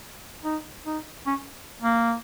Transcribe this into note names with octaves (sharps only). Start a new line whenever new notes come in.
D#4
D#4
C#4
A#3